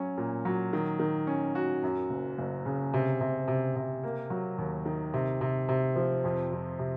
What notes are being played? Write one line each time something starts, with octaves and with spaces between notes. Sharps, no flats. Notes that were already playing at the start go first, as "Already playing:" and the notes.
Already playing: F#3 C#4
A#2
F#3
D#3
D#3
C#4
F#4
F#2
F#1
F#1
C#3
C3
C3
C3
C3
A#3
F#3
D#2
D#3
C3
C3
C3
F3
F2
F2
C3